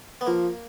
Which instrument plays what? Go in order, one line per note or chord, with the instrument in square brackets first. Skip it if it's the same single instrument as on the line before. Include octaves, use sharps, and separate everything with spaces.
[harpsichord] B3
[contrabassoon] F3 [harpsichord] A#3